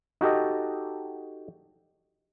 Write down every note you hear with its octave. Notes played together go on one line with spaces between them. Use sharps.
D#4 F#4 G4 A4 D#5